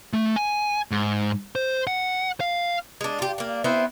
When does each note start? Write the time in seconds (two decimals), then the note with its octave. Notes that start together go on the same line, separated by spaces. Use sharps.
0.13 A3
0.36 G#5
0.91 G#2
1.55 C5
1.87 F#5
2.40 F5
3.01 G#3 D4
3.19 F4 G4
3.38 A#3 D4
3.64 B3 C4 E4 C5